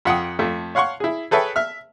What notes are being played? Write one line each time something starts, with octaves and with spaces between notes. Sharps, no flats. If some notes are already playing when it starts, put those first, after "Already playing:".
F2 F#5 G5 D#6
F2 A3
C#5 F5 F#5 C6 C#6
E4 G#4
G#4 A4 B4 C#5 E5 G5
E5 F6